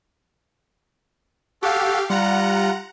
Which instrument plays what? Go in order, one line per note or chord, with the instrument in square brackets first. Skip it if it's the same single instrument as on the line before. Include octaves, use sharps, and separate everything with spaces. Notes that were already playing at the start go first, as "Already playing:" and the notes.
[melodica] F#4 A4 [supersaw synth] G4 F5
[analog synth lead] G3 [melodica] F4 [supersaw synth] F#5 A#5